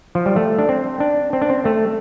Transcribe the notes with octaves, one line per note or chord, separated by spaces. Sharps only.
F3
G3
A3
D4
C4
D4
C4
D4
C4
A3